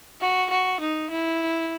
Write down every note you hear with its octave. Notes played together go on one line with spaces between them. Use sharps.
F#4
F#4
D#4
E4